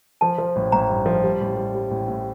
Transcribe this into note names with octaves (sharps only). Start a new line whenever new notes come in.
F3 A5
F3
A1
A1 A#5
G2
F3
G3
A1
G3
G3
A1
A2